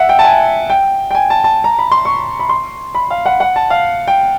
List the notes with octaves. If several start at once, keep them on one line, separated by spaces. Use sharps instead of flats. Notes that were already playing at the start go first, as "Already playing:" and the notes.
Already playing: E5 F#5
G5
A5
G#5
G5
G5
G#5
A5
A5
A#5
B5
C6
C#6
B5
C6
B5
F5
F#5
F#5
A5
F5
G5